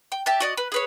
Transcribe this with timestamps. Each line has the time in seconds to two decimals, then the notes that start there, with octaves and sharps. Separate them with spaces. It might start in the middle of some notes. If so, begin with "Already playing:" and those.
0.12 G5
0.26 G4 E5 A5
0.40 F#4 D5 D#5
0.57 B4
0.72 G#4 B4 C#5